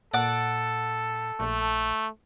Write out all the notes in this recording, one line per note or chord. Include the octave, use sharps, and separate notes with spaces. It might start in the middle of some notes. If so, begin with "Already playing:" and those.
A#2 A4 D5 F#5 D6
A#1 A3